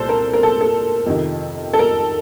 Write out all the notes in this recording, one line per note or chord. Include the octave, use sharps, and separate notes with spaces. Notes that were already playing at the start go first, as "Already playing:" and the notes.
Already playing: C2 A#2 A4 C5
A#4
A#4
A4
A4
F2 C3 D#3
A4
A#4